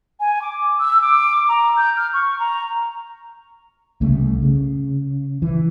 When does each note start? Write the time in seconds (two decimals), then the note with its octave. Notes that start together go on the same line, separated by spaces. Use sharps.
0.20 G#5
0.42 D6
0.80 E6
1.02 D6
1.49 A#5
1.77 G6
1.97 F6
2.14 C#6
2.39 A#5
4.01 C2 C#3 A3
4.42 C#3
5.42 E3